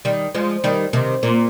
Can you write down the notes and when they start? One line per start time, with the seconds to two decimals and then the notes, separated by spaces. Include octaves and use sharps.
0.05 D#3 G3
0.34 F3 G#3
0.64 D#3 G3
0.93 C3 D#3
1.23 A#2